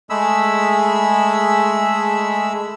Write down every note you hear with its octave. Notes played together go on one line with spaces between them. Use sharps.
G#3 A3 G#4 B5 E6